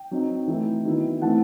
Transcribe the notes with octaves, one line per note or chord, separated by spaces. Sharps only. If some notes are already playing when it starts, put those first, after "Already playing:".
Already playing: G5
F#3 C4 D#4
E3 A3 E4
D#3 F#3 B3 E4
E3 A3 C4 E4 F#5 A5